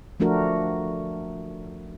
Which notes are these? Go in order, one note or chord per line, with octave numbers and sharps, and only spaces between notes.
F3 A3 D4 F#4 A#4